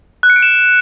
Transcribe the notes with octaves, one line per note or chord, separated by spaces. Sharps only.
F#6
C#7
D7
E7